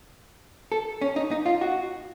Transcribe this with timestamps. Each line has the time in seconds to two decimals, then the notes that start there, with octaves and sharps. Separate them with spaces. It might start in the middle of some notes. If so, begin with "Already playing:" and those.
0.72 A4
1.01 C#4
1.16 D#4
1.31 D#4
1.46 F4
1.61 F#4